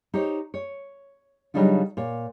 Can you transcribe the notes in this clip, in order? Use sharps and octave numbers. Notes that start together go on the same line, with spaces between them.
D#4 G4 C5 C#5
C#5
C#3 F#3 G3 D4 D#4 F4
A#2 C#5